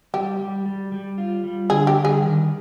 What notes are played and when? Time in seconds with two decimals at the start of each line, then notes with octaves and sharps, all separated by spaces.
0.14 G3 G4
0.40 G3
0.66 G3
0.92 G3
1.18 F4
1.44 G3
1.70 D3 G#4
1.87 G4
1.96 G3
2.05 G#4
2.22 D#3